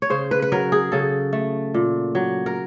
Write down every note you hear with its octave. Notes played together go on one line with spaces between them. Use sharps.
C#5
C#3 C5
B4
B4
F#3 A#4
G#4
C#3 A4
A3
A#2
F#3
A#4